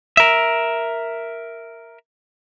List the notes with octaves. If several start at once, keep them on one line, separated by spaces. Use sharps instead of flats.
A#4 E5